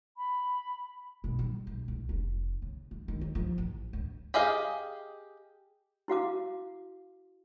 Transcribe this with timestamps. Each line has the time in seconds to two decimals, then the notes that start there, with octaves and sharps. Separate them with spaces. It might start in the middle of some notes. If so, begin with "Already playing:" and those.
0.17 B5
1.24 B2
1.39 G3
1.67 A#1
1.88 C2
2.09 F1
2.62 C#3
2.91 C#3
3.08 D#3
3.21 D#2
3.35 F3
3.58 A1
3.93 D2
4.34 G4 G#4 D#5 F5
6.08 E4 F#4 F5 D6